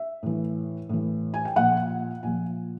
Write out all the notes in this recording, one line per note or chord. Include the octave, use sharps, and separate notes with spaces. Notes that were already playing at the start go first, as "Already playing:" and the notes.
Already playing: E5
A2 E3
A2 E3
G#5
G5
A#2 F3 F#5
A#2 F3 G#5